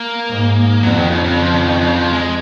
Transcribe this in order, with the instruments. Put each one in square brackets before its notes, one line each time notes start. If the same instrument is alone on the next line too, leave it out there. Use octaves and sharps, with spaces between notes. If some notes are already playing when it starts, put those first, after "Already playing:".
Already playing: [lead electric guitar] A#3
[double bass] G#2
[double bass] F2 [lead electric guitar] F#3
[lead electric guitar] C#3
D#3
C#3
C#3
F3
C#3
D#3
C#3
F3
G#3